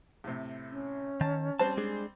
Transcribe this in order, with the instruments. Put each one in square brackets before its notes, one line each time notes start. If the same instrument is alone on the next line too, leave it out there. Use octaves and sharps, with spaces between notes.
[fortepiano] A2 C3
[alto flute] C#4
[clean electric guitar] D#3 [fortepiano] A5
[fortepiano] G3 C4 C5 [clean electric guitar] A5
[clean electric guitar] G#3 D4 G#4